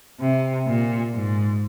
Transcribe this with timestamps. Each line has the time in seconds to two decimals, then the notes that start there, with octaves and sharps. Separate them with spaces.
0.20 C3
0.67 A#2
1.13 G#2